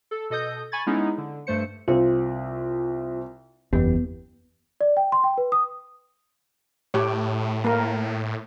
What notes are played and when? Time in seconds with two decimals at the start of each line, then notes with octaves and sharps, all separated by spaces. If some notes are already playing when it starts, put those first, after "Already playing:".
0.11 A4
0.30 B2 A4 D#5 D#6 G6
0.72 G#5 B5 C#6 G#6 A6
0.86 G#3 B3 C#4 D#4 E4 G#4
1.18 D3
1.47 G2 A3 C5 C#7
1.88 C2 C4 F4
3.73 F#1 E2 B3 G4
4.81 D5
4.97 G5
5.12 C6
5.24 G5
5.38 B4
5.52 D#6
6.94 A2 G4 C#5
7.64 A#3 A#4